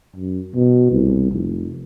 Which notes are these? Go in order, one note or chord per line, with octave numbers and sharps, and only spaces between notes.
F#2
B2
C2
F1